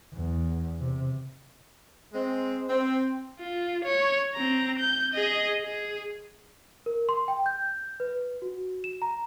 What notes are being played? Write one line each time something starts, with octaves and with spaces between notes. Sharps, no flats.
E2
C3
G#3 C4
C4
F4
C#5
C4 A#5
G6
G#4 D#5
G#4
A#4
C6
G5
G6
B4
F#4
E7
A#5